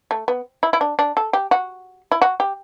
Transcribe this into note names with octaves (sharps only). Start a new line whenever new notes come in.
A3
B3
E4
E4
D4
D4
A4
G4
F#4
E4
F#4
G4